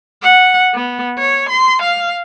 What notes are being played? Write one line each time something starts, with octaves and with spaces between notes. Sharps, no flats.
F#5
B3
C#5
C6
F5